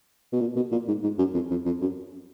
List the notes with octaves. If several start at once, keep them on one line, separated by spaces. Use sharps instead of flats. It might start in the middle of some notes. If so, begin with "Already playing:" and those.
B2
A#2
B2
A#2
G#2
G#2
F#2
F2
F2
F2
F#2